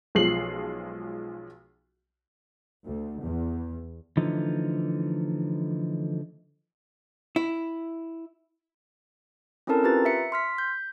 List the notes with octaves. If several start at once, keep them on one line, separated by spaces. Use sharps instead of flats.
B1 F3 G#3 C7 F#7
D2
E2
D3 E3 F3 A3 D#4
E4
C4 C#4 E4 A4 A#4 A5
F4 G4 B4 A#5 A6
E5 C#7
C6 F6 B6
G6